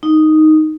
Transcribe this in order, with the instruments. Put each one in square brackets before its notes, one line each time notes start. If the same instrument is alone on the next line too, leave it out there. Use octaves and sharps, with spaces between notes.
[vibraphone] D#4